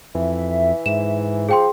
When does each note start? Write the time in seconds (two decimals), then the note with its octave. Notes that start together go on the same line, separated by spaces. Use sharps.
0.15 F2 E3 E5
0.86 G#2 E7
1.49 F3 G#4 G5 C6